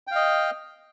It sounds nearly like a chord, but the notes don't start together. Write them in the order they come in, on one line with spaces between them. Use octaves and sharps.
G5 F5 D#5